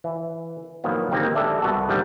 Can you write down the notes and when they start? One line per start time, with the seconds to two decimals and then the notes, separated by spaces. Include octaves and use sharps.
0.04 E3
0.84 A2 D#3 F3 F#3 A#3 B3
1.11 D3 D#3 A#3 C4 D#4 G4
1.35 G#3 B3 G4 A4 D5 E5
1.62 C2 B3 F#4 A4
1.89 G#2 D3 F3 G3 A3